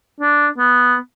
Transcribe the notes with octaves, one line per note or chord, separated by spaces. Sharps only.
D4
B3